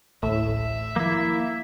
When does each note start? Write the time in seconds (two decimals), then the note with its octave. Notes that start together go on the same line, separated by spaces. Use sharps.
0.23 A1 D2 A2 E5
0.96 D#3 F3 A#3 E4